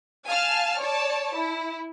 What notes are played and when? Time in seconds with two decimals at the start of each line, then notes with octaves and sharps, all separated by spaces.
0.25 F5 G#5 A5 F6
0.78 C#5 D5 A5
1.33 E4